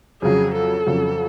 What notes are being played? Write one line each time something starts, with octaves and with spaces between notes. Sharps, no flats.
F2 C#3 F#3 G#4
A4
F2 C#3 F#3